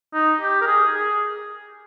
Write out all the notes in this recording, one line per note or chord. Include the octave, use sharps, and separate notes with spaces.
D#4
G4
A#4
G#4
G#4